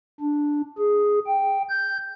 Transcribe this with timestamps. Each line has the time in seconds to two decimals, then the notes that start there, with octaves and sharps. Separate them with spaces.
0.21 D4
0.79 G#4
1.27 G5
1.69 G6